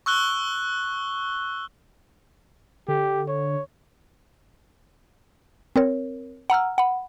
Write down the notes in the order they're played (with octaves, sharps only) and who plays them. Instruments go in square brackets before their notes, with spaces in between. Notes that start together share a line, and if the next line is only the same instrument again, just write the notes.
[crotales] C#6 E6 F#6 G7
[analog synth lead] D3 [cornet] G4
[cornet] C#5
[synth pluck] C4 A#4 C#5
F#5 A#5 E6 F6
F#5 B5